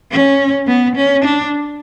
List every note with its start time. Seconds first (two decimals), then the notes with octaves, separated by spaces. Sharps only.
0.11 C#4
0.67 B3
0.96 C#4
1.24 D4